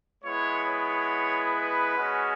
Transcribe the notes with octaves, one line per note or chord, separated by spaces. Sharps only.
G#3 B3 E4 C#5
C#5
B4
G#3 C#4 F#4